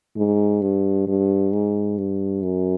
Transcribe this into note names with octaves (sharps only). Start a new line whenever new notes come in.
G#2
G2
G2
G#2
G2
F#2